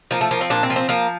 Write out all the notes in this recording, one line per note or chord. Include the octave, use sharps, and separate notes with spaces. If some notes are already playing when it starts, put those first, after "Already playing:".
F3 A#3
A3
F3 A#3
C4
A#2 D4
C4
F3
C4
F3 A#3